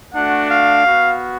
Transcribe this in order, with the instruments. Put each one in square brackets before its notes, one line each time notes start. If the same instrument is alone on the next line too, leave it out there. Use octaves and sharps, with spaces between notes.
[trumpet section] A3 D4 F#4 F#5
F5
B3 F#4